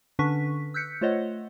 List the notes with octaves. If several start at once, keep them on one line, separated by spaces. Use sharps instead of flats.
D3 C#4 D4 B4 C#6 B6
E6 F#6 G6 B6 C#7
A3 F4 C5 C#5 D#5 F#5